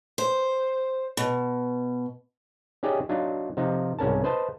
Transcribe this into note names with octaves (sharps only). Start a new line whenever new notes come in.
C5
B2
C#4 D#4 G4 G#4 D5 D#5
F#3 D4 D#4 F4
C3 F3 D#4
C2 G#2 C#4 A#4 A5
B4 C5 D#5 A5